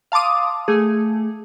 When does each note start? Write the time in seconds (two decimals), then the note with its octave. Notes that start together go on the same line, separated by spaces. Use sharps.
0.12 F5 A5 C6 D6 D#6
0.68 A3 G#4